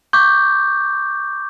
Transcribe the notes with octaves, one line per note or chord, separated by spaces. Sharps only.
C#6 D6 G6